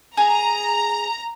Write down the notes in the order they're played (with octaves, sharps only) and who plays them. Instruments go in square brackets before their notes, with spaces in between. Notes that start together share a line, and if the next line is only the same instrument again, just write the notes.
[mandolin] G#4 [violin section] A#5